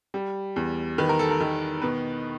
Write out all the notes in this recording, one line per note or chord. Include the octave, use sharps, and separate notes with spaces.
G3
E2
D#3 B4
A#4
A4
A#4
D#3
B2 B4